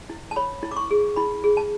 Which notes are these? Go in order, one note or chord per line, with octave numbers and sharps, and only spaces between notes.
E4
A5
C#5 B5
E4
D6
C#6
G#4
E4 B5
G#4
A5